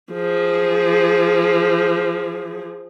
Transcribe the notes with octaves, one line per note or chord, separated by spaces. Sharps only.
F3 G#4